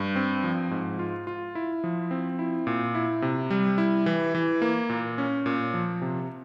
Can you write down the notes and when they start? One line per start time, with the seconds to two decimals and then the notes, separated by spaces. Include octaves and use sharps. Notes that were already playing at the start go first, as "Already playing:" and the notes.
Already playing: G2
0.16 C4
0.44 F3
0.71 G#2
0.99 F4
1.27 F4
1.55 E4
1.84 F3
2.11 C4
2.39 E4
2.67 A#2
2.95 E4
3.22 C3
3.50 G3
3.78 E4
4.06 E3
4.35 E3
4.62 A#3
4.89 A#2
5.18 C#4
5.46 A#2
5.74 F3
6.02 C3